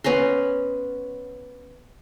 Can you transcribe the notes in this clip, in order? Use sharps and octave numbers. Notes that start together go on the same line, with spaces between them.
B3 C#4 A#5 C6